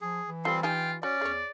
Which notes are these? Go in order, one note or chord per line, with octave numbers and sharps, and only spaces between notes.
F3 G#4
E3
G3 C4 F4 A4 C6
D#4 F4 G4 G5 G#5
C#4 F#4 D5
E2 G#4 C#5